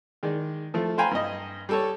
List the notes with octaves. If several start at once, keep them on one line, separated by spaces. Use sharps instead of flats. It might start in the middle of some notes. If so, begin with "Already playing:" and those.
D#3 G#3 D5
F3 A3
C5 F5 G5 G#5 A#5 B5
G2 D#5
G3 A4 C#5